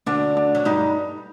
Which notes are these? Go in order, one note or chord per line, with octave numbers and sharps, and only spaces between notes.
D2 D3 D4
D4
F#3
G2 G3 D#4